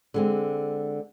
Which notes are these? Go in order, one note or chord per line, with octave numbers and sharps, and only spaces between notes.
D3 G#3 C4